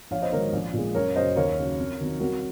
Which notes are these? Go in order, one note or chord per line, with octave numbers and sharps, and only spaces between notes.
A#1 C#5 F5
C5 D#5
G#2 D#3 F#3 A#4 C#5
A#1
A#2
G#3
F#1 A#4 C#5
F#2 C#3 F#3 C5 D#5
D#2 A#4 C#5
C#3 F#3
F2
C3 D#3 F#3
C2 F#4 A#4